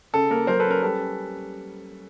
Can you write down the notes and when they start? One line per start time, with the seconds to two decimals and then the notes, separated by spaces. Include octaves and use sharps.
0.13 C#3 A4
0.31 A#3 A#4
0.47 F#3 A#4 C5
0.60 A4 B4
0.66 C#4 A#4
0.82 G3 A4 B4
0.99 C#4